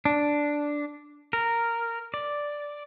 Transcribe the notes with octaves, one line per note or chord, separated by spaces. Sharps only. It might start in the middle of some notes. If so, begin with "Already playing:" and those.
D4
A#4
D5